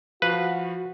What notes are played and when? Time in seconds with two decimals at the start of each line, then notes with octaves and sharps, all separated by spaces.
0.22 F3 F#4 B4 F5 B5